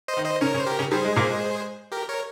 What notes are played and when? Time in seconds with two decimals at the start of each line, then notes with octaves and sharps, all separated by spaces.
0.08 C5 D#5
0.16 D#3 D#4
0.25 C5 D#5
0.41 C#3 C#4 A#4 C#5
0.54 C#3 C#4
0.59 C5
0.66 G4 A#4
0.79 C#3 C#4
0.91 G3 G#4 C5
1.05 G#3
1.16 A#2 A#3
1.30 G#3
1.92 G4 A#4
2.08 A#4 C#5